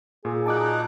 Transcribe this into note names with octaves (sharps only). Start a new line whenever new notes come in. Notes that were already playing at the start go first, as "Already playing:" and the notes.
A#2 G#4
F#3 D#4 A5 D6 F#6